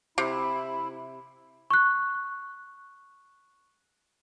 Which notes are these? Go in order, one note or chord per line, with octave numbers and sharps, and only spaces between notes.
C3 E4
C#6 F#6